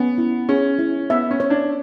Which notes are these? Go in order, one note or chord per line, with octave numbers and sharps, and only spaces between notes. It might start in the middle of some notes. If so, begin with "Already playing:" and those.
Already playing: B3 C#4
E4
C#4 G#4
E4
B3 E5
C#4
C#5
D4